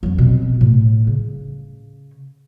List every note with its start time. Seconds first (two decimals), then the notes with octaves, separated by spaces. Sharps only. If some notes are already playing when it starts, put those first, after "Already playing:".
0.03 F2 F#3
0.18 B2 C4
0.61 A2
1.07 C#3